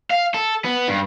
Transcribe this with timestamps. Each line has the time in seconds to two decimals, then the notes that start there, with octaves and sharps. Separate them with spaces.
0.11 F5
0.34 A4
0.64 B3
0.88 G2